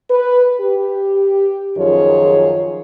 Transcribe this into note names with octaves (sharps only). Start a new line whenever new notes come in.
B4
G4
F#2 D#3 F3 F4 G#4 C#5